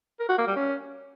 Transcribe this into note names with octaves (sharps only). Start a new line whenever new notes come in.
A#4
F#4
A#3
G3
C#4